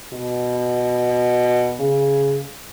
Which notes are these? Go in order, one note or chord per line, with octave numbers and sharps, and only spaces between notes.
B2
C#3